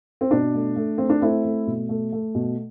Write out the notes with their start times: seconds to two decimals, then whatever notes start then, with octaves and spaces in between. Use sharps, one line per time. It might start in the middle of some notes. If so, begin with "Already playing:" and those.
0.21 C4
0.31 B2 D4
0.54 A3
0.76 A3
0.98 A3 C4
1.09 D4
1.21 A3 C4 E4
1.44 A3
1.67 B2
1.89 A3
2.12 A3
2.35 B2